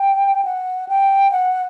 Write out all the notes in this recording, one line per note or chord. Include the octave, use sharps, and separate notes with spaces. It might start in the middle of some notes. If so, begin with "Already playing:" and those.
Already playing: G5
F#5
G5
F#5